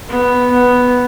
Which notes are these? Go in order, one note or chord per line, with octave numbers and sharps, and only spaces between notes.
B3
B3